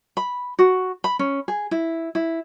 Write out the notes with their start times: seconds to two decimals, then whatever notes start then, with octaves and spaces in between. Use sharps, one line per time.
0.17 B5
0.59 F#4
1.04 B5
1.19 C#4
1.48 G#4
1.71 E4
2.15 E4